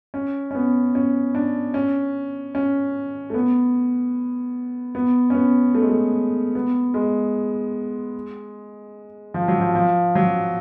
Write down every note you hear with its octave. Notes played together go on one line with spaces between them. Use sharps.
C#4
C#4
B3
C#4
D4
C#4
C#4
A3
B3
B3
C#4
B3
A3
G#3
A3
B3
G#3
F3
F#3
F3
F3
F#3